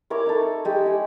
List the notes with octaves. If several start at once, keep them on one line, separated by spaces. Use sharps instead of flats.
E4 A#4 C#5 D6
D#4 A4
G#3 G4
E4 G#4